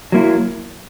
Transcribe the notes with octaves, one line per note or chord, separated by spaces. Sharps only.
F#3 A#3 E4